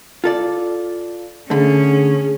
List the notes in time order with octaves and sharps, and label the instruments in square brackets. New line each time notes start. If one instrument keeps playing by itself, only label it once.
[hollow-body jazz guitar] F4 A4 D5
[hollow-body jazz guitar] D3 A3 [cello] C#4 [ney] G#4